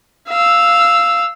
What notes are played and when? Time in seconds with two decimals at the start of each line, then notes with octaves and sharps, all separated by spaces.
0.29 F5 E6